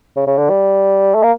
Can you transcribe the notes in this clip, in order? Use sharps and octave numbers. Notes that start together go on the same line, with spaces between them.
C#3
C#3
D3
G3
A3
A#3